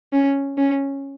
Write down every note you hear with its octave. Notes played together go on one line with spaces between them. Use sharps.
C#4
C#4